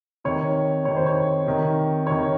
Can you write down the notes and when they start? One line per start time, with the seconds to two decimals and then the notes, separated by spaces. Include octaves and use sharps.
0.24 C3 D#3 C#5
0.85 C3 D#3 C#5
0.96 C5
1.06 C#5
1.46 C3 D#3
2.07 C3 D#3 C#5